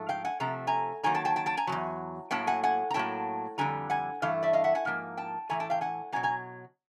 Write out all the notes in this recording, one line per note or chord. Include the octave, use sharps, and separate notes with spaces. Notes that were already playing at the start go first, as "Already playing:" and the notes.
Already playing: G#2 F3 A3
F5 G5
F#5 G#5
C3 F3 A3 A#5
G#5 A#5
G2 D#3 F#3 A#3 G#5 A#5
G5 A5
G5 A5
G5 A5
G5 A5
G#5 A#5
E2 B2 F#3
A2 F#3 A#3 G5 A5
F#5 G#5
F#5 G#5
A#5
A2 F#3 A#3 G5 A5
F2 D3 G3 G#5 A#5
F#5 G#5
G2 E3 A3 F5
D5 E5
D#5 F5
E5 F#5
F#5 G#5
G#2 F3 A#3
G5 A5
A2 E3 A3 G#5 A#5
G5 A5
F5 G5
F#5 G#5
B2 F#3 A#3 G#5 A#5
G#5 A#5